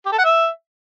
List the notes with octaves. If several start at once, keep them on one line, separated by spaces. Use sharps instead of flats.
G4
A4
F#5
E5